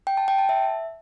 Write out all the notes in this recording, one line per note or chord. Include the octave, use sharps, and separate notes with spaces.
G5
A5
G5
A5
E5